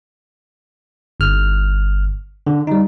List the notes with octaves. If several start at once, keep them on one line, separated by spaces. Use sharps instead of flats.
G1 F6
D3
G3 D#4